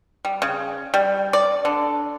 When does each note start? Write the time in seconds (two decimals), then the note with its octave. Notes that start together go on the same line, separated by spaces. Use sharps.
0.25 G3
0.42 C#3
0.94 G3
1.33 D5
1.65 D3